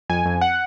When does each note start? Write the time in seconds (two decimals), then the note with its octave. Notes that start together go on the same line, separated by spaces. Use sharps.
0.09 F2 G#5
0.26 F2
0.41 F#5